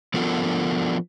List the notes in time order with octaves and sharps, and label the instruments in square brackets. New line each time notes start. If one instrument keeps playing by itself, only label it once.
[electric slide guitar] F3 B3 D4 F4 A4 A#4